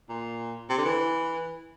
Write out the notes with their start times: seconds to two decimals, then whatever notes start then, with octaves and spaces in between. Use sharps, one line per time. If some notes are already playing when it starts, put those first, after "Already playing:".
0.09 A#2
0.70 C3
0.78 D3
0.85 E3